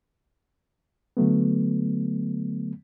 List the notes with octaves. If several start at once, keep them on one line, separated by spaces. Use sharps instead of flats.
D3 F#3 A3 B3